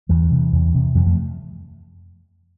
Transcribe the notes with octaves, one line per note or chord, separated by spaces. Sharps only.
E2 E3 G3
C3
E2
C3
F2 E3 G3
F3 A3